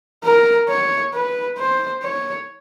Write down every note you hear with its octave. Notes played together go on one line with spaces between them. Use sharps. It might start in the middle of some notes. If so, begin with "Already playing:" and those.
A#4
C#5
B4
C5
C#5